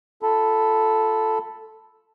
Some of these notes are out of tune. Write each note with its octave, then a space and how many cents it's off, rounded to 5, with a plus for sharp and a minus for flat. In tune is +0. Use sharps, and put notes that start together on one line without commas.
F4 +0 A4 +0 B5 +0